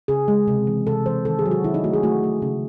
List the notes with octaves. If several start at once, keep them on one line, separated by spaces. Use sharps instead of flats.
C#3 G#4
G#3
C3
E3
C3 A4
E3 C5
D#3 A4
G#4
F#3
F#4
D#3 E4
D#4
A3 F#4
G#4
A3 F#4
A3
C#3